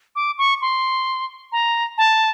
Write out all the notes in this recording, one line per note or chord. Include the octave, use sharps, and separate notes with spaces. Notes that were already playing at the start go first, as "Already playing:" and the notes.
D6
C#6
C6
A#5
A5